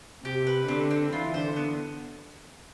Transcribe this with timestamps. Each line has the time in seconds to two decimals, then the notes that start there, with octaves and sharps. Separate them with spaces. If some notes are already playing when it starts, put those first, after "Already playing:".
0.25 C3 G4
0.47 B4
0.68 D3 C4
0.91 C4
1.12 E3 F4
1.34 C5
1.41 D3
1.56 B3